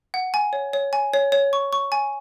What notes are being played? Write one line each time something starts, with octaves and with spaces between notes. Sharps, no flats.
F#5
G#5
C#5
C#5
G#5
C#5
C#5
C#6
C#6
G#5